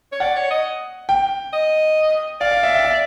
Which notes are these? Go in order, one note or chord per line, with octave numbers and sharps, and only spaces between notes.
C#5
D5 F#5
C#5
D#5
G5
D#5
D5 F5
F5
E5
E5
E5